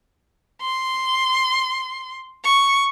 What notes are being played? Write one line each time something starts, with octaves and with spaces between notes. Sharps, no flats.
C6
C#6